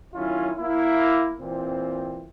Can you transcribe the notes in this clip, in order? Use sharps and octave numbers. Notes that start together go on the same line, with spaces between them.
D#3 F#3 C#4 E4 F4
A#3 E4
A#2 E3 C4